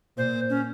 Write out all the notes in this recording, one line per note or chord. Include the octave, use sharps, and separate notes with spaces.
A#2 C5
C#4